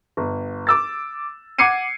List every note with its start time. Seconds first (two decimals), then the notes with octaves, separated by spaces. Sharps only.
0.17 G1
0.67 D6 E6 A6
1.59 F#5 D6 G#6 C7 C#7 D#7